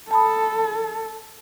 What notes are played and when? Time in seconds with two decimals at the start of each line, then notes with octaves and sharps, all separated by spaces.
0.11 A4 A5 B5 D#6